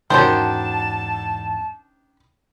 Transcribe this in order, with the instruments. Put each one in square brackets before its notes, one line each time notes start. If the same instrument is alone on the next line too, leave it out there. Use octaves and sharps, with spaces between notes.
[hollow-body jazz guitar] E2 G#2 F#4 [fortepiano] D#3 [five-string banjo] C#4 D4 C5 [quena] A5